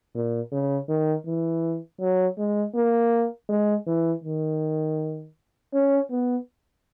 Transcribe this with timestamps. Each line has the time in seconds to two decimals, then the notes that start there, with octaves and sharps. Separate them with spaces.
0.15 A#2
0.52 C#3
0.89 D#3
1.26 E3
2.01 F#3
2.39 G#3
2.75 A#3
3.49 G#3
3.87 E3
4.24 D#3
5.74 C#4
6.11 B3